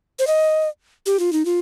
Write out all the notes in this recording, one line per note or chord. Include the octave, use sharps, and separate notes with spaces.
C5
D#5
G4
F4
D#4
F4